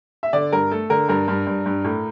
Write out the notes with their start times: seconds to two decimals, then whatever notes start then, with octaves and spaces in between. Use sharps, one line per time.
0.23 E5
0.33 D3 D5
0.53 G2 A#4
0.71 A3 A4
0.90 D3 A#4
1.09 G2 A#4
1.28 G2
1.47 G2
1.66 G2
1.85 A2